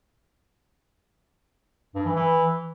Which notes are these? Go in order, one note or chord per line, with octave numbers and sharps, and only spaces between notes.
G2
E3
E3